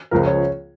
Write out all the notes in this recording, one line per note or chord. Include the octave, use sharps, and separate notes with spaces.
C#2 C#3 F3 A#4
C#5